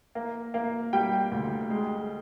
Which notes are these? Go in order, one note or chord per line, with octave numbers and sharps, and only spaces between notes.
A#3
A#3
G3 G5
D2
G#3